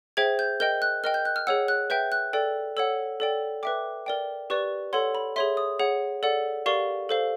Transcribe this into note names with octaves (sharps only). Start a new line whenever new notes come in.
G#4 C5 E5 G5 G#6
G6
A#4 D#5 G5 G6
F#6
A#4 D#5 G5 F6
G6
F#6
F6
G#4 C#5 F#5 E6
F#6
B4 E5 G5 G6
F#6
A4 D5 G5
A4 C#5 F#5 E6
A4 D5 G5
B4 E5 G5 D6
A#4 D5 G5
G4 B4 D5 C#6
A4 C#5 F#5 C6
B5
G#4 C#5 E5 C6
D#6
G#4 C#5 F#5
A4 D5 F#5
G4 A#4 D5 F5 C#6
A4 C5 F5